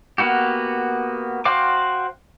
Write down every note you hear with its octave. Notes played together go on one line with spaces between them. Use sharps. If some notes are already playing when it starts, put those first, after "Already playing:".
A#3 B3 F#4 G4
F#4 C5 F5 G5 D6